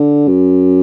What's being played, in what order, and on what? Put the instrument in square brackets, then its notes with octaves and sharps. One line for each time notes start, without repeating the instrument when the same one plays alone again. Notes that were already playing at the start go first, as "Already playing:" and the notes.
Already playing: [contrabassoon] D3
F#2